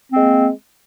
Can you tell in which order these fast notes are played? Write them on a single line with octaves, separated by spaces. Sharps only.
C4 A#3 G#3